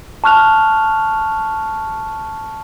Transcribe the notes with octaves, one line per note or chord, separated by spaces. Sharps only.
A5 C#6 F6 F#6 F7